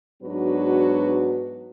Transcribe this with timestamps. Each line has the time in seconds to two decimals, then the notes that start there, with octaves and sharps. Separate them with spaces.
0.23 G#2 F#3 B3 D4 F#4 B4